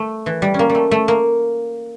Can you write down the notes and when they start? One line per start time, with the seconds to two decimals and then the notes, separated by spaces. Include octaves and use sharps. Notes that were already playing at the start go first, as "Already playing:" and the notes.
Already playing: A3
0.26 E3
0.42 G3
0.54 C#4
0.59 A#3
0.70 G3
0.75 A3
0.91 A3
1.08 A#3